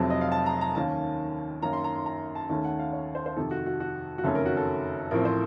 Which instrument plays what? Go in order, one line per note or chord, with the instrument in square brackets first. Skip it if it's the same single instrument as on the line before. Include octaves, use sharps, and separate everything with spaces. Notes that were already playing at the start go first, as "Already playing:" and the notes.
Already playing: [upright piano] F1 F2 C3 F#3 C4 A5
D#5
F5
A5
A#5
A#5
D#2 D#3 A#3 C#4 A5
F#2 D#3 A#3 C#4 A#5
C6
A#5
C6
A#5
A5
D#2 D#3 A3 C#4 A5
F#5
F5
C#5
C5
C5
F2 C3 D#3 A4
F#4
F#4
F#4
F#4
F#1 F2 D#3 A3 C#4 A4
A#4
F#4
A4
A1 A2 F3 C4 A#4
C5